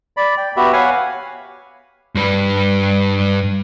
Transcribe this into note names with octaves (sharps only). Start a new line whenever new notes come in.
D5 B5
G5
B3 F#4 G4 E5 B5
C#5 F5 F#5 G#5 B5 C#6
G2 B4